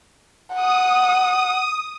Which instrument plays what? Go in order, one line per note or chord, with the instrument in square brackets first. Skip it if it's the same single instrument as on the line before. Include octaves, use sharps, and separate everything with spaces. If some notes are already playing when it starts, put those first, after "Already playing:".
[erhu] F#5 [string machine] D#6